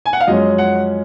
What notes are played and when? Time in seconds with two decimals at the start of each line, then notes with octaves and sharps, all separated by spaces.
0.06 G#5
0.13 F#5
0.20 F5
0.27 F#2 F3 G#3 C#4 D#5
0.58 F#5